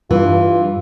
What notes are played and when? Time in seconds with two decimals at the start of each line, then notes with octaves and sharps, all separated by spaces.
0.11 G2 E3 F4